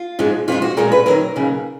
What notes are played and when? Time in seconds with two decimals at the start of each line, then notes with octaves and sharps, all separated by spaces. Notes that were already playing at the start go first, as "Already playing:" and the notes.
Already playing: F4
0.19 G#2 F3 G#3
0.48 F2 F3 G#3 F4
0.62 F#4
0.77 A#2 F3 G#3 A#4
0.92 B4
1.06 F2 D#3 F#3 A#4
1.36 D#2 C#3 F#3